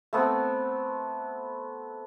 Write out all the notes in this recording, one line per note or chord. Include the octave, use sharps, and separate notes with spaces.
A3 B3 C4